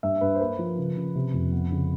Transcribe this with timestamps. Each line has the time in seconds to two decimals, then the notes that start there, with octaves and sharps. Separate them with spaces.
0.03 G2 E5
0.21 G2 B4
0.35 C5
0.41 A#3 B4
0.59 F3
0.78 C#3
0.97 C#3
1.15 C3
1.34 F2
1.52 B3
1.72 C#3